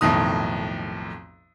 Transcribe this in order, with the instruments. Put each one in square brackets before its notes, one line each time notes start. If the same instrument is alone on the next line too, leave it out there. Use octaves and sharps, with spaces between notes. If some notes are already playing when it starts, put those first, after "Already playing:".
[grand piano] B1 F2 A2 D#3 D#6